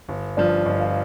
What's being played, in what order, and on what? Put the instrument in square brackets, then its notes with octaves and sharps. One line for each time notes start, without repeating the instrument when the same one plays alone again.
[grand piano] G1
[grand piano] G2 F3 [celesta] D5
[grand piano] G1 [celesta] D#5
[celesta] F5